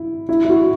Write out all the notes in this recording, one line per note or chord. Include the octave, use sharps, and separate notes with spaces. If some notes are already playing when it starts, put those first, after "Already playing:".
Already playing: E4
E4
E4
F#4